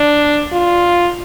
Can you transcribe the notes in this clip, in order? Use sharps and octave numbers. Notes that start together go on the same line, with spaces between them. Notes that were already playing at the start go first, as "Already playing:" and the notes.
Already playing: D4
F4